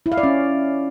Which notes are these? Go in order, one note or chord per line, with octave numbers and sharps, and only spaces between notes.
E4
F5
D5
C#4